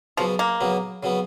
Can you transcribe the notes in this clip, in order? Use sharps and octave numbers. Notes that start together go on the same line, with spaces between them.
C#3 F3 F#3 B3
A#3
C#3 F#3 B3
C#3 F#3 B3